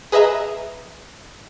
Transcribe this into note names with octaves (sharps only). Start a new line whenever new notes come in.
G#4 B4 D#5 E5 A#5